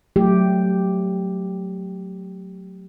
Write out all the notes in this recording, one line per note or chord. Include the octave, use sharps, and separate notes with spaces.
F#3 A3 G4